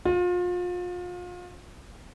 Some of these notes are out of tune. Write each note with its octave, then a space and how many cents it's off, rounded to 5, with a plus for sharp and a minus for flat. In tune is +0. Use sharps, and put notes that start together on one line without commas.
F4 +35